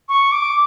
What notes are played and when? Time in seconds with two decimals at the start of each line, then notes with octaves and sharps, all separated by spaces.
0.09 C#6
0.32 D6